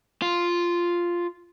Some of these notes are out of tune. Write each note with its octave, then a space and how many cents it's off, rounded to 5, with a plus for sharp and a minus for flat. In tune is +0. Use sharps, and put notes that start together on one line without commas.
F4 -5